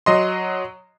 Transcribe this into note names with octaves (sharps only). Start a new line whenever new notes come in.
F#3 D#5 C6